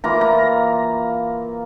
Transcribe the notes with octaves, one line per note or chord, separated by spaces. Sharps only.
E3 A#3 F4 A#5
A#5